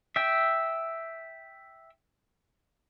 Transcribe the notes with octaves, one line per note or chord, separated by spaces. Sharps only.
E5 G5